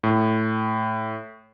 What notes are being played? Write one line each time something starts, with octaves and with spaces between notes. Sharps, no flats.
A2